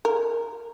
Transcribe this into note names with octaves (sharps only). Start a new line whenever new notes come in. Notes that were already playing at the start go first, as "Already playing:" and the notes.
A#4